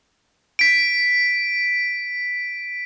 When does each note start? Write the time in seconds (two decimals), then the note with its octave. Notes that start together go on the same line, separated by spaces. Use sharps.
0.59 B6 D7